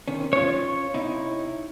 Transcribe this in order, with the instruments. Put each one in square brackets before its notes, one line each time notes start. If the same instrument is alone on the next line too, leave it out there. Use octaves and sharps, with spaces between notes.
[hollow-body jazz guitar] C3 D#3 C#4
[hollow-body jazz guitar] C#4 F4 [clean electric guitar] C#5
[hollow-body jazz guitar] C3 D#4 E4